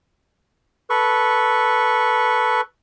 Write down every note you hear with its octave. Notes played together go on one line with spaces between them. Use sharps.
A4 B4 C#6